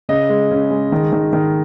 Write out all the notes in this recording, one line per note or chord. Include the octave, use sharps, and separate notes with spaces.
C#3 D#5
G#3
C#3
G#3
D#3
D#3
D#3